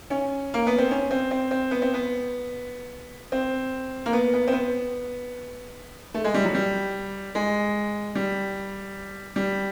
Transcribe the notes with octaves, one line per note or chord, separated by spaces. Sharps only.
C#4
A#3
B3
C4
C#4
C4
C4
C4
B3
C4
B3
C4
A#3
B3
B3
C4
B3
A3
G#3
G3
F#3
G3
G#3
G3
G3